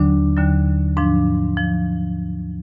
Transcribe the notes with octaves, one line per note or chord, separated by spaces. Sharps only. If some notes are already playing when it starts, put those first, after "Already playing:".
Already playing: D#2 D3 F#3 D4
D#2 D3 F#3
G#2 F3 D4
F3